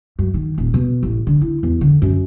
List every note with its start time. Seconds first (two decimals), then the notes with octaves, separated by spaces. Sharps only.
0.19 F#2
0.34 D#3
0.58 D#1
0.74 B2
1.03 A1
1.27 D3
1.41 E4
1.63 E2
1.81 D3
2.02 F#2